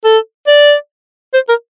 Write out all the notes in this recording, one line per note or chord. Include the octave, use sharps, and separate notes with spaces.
A4
D5
C5
A#4